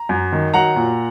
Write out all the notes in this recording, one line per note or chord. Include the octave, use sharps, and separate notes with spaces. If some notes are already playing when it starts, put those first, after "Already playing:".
Already playing: A#5
F#2
D#3
F#3 F#5 A#5
A#2